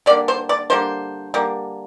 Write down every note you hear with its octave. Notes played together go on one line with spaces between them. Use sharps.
D3 G3 A#3 D5
C5
D5
D3 G3 A#3 C5
D3 G3 A#3